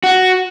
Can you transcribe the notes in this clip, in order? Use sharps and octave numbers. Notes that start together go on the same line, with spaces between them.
F#4